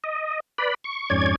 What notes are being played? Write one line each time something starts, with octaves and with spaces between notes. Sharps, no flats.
D#5
B4 D5 B5
C#6
F2 G#2 C#4 C#5 D5 G#6